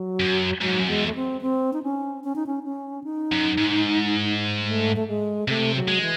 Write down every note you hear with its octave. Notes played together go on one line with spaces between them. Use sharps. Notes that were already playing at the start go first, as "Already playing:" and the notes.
Already playing: F#3
F#2
G#2 F#3
F#2
E2 G#3
A3
C4
C4
D#4
C#4
C#4
D#4
C#4
C#4
D#4
F#2
G#2
G#3
A3
A3
G#3
C3 A3
F#3
G#3
E3